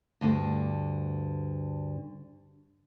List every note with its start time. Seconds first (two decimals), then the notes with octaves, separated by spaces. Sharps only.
0.21 D2 G2 D3